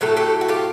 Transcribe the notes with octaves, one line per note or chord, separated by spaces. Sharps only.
A2 F#3 A3 G4 A4
G4 A4
F#4
F4 G4